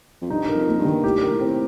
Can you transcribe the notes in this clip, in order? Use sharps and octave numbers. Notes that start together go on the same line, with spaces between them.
F2
G2 D#4
A#4
F2
A#3
G2
D#3
A2 G4
G2 A#4
A2
C4